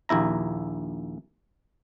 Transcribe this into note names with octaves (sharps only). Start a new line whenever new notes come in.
A#1 D#2 E4 A#5